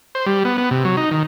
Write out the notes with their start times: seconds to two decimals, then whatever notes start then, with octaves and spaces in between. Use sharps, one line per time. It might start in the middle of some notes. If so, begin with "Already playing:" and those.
0.15 C5
0.26 G3
0.45 B3
0.58 B3
0.71 C3
0.85 F#3
0.97 D#4
1.11 D#3